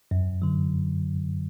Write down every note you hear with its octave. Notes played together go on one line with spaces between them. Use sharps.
F#2
D3 F#3